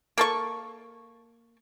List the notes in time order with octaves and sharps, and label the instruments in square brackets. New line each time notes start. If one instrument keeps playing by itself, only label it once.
[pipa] A#3 A4 C#6